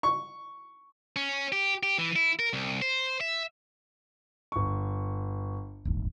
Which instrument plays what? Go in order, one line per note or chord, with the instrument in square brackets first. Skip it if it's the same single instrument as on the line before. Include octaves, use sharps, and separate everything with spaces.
[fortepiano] C#6
[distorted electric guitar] C#4
G4
G4
E3
E4
A#4
C2
C5
E5
[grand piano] G1 C#6
[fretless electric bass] D1 G1 D#2